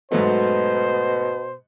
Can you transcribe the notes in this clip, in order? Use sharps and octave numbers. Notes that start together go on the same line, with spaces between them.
G#2 B2 F#3 A3 C5